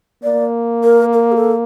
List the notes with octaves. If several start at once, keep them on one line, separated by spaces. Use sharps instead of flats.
A#3 D5
A#4
A#4
G4
A4